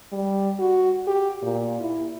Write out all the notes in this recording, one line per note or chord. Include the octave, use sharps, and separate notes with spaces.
G3
F#4
G4
A#2
E4